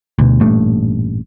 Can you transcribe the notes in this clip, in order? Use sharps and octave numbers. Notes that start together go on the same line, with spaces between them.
D2 B2
A1 G2 A#2 A3